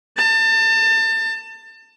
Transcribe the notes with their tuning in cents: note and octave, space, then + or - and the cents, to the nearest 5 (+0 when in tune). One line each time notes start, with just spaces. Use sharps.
A5 +30